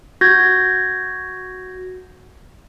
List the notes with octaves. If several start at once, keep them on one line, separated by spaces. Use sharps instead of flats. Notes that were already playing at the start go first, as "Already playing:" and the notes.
F#4 G6 G#6 A#6